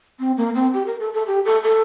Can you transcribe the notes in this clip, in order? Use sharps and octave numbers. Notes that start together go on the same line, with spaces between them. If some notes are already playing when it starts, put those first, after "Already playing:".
C4
A#3
C4
G4
A#4
A4
A4
G4
A4
A4